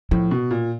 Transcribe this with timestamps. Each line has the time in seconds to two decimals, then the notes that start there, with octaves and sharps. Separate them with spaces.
0.11 A2 F3
0.31 B2
0.51 A#2